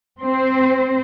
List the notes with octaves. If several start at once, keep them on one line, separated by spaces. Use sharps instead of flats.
C4 C5